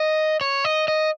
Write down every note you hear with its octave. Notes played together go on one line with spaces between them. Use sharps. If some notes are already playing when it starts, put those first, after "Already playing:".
Already playing: D#5
C#5
D#5
D#5